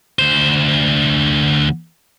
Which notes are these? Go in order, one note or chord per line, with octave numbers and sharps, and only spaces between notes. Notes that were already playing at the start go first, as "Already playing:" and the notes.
D2 C5